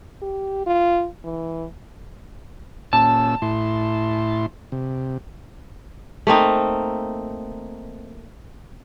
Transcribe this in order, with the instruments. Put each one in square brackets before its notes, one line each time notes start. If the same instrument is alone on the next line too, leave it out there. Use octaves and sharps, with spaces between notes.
[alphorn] G4
F4
E3
[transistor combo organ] A#2 C#4 E6 [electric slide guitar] A5
[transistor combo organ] A2 E4 C6
C3
[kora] A3 A#3 C4 D#4